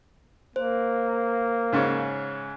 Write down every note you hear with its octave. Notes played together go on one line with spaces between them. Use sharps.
A#3 C5
G#2 C#3 C#4